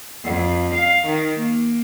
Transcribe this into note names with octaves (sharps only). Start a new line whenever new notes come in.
F2
F5
D#3
A#3